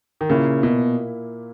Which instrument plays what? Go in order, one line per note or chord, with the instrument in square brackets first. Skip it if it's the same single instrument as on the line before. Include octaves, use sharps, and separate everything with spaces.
[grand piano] D#3
[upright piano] A#2 A#3 E4 [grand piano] C#3
[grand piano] B2